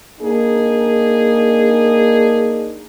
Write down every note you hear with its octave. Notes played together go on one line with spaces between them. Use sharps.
A#3 D4 D#4 G#4